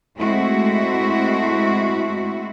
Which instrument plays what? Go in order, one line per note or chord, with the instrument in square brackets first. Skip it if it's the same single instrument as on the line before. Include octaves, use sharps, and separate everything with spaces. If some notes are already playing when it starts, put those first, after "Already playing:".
[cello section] G#3 A3 C4 E4 F#4